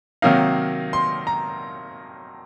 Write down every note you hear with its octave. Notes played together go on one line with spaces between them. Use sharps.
C3 D#3 F#3 A#3 D#4 F5
C6
A#5